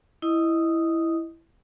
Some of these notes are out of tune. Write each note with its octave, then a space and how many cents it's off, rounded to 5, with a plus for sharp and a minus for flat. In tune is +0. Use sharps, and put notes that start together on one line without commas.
E4 +0 D#5 +0 D#6 +0